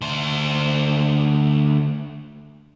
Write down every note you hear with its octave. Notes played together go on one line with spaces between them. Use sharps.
D2 C5